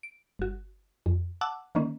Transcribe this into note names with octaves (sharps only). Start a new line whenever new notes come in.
D7
G1 F#4
F2
F#5 A5 D6 E6 F#6
D3 D#3 A#3 C#4